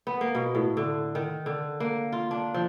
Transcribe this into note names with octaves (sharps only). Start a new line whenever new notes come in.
B3
A#3
B2
A2
D3
D#3
D3
A#3
F4
D4
F3